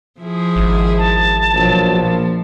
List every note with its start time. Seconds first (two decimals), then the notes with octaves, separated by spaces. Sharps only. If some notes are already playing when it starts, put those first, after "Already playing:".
0.20 F3 E4 G#4
0.56 G#1
0.98 A5
1.54 A#1 B2 F#3
2.01 A#2 F3